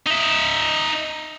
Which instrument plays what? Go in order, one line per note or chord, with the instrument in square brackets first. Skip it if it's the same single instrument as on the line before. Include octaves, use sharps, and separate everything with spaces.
[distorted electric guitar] D#4 E5